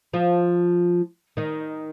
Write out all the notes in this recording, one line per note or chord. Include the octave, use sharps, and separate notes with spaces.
F3 F4
D#3 D#4